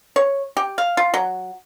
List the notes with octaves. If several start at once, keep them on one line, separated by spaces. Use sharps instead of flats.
C#5
G4
F5
F4
F#3